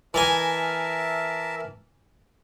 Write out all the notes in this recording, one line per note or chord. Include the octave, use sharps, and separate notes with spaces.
E3 A#4 D#5 E5 G#5 A5